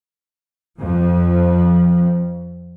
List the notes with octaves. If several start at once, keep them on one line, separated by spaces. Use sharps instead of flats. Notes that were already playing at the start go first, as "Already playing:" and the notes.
F2 F3